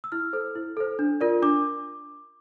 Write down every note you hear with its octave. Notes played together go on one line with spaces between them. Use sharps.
E6
E4 F6
A4 C5
E4
A4 C5
D4
F4 A#4 D5
D4 D6